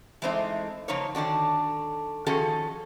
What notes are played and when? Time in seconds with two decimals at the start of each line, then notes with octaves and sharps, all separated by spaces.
0.22 E3 G#3 A3 C4 D#4 C5
0.88 C#3 F3 A#3 D#4 C5 C#5
1.15 D3 D#3 D4 F#4
2.26 D#3 F3 C#4 F#4 G#4 A4